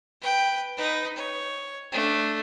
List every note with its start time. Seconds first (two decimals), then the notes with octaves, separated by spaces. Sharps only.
0.21 B4 G5
0.77 D#4 B4
1.16 C#5
1.92 A3 D4